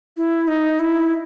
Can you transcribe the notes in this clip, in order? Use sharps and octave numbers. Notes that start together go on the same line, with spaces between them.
E4
D#4
E4